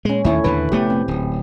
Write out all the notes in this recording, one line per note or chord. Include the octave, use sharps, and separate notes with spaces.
A#2 G#3 C#4
D#2 D#3 A3 E4 C#5
D#2 D3 B4
F1 A3 B3 G4
C4
D1